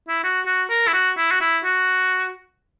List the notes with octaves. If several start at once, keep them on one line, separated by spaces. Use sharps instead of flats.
E4
F#4
F#4
A#4
E4
F#4
E4
F#4
E4
F#4